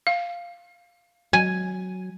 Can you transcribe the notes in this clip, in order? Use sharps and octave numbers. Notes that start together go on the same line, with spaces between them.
F5
F#3 G#5